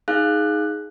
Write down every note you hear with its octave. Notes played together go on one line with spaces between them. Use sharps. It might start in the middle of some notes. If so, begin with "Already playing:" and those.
D#4 G#4 F5 F#6